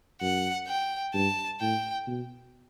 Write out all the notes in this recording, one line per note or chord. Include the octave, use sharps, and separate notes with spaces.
F#2 F#5
G5
G2 A5
A2 G5
B2